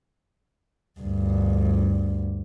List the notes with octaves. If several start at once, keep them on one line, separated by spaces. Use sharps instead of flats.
D2 G2